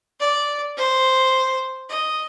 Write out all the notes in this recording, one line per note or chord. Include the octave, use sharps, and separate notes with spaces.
D5
C5
D#5